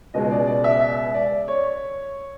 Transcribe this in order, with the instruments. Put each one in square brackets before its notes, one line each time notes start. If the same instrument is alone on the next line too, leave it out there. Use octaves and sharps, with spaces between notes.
[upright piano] C#2 B2 G#3 D#5
D5
D5
E5
E5
D5
C#5